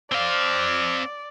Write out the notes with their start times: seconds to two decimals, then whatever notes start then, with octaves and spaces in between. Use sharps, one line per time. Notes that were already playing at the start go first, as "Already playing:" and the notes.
0.12 C4 D5 F5